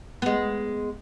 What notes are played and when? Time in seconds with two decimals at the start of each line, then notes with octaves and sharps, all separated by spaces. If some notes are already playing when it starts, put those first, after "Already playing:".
0.22 G#3 B3